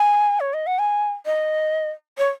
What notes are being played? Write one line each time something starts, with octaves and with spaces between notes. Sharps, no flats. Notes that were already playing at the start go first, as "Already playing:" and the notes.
Already playing: G#5
C#5
D#5
F#5
G#5
D#5
C#5